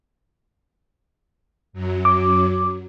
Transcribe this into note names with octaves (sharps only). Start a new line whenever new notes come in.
F#2 F#3
D6